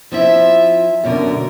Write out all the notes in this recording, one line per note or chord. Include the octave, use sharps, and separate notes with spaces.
F3 C4 E4 E5
F#2 B2 D3 A#4